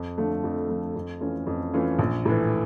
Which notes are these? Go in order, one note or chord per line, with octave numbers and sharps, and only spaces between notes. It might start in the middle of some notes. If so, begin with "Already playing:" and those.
Already playing: F2
D3 F3 A3
F2
D3 F3 A3
F2
E3 A3 C#4 F4
F2
E3 A3 C#4 F4
A#1
A2 E3